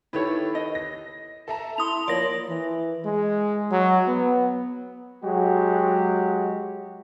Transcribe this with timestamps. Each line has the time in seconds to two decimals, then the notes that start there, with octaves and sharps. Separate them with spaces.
0.13 D#3 E4 G4 A4 B4 C#5
0.55 D#5
0.75 A#6
1.48 A4 E5 A5 A#5
1.78 E4 C6 D#6 F7
2.08 F3 A#3 C#5 D5 A#6 F#7
2.50 E3
3.05 G#3
3.71 F#3
4.08 B3
5.22 F#3 G#3 F#4 G4